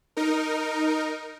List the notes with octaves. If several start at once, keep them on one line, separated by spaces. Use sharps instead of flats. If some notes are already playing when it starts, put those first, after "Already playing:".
D#4 A#4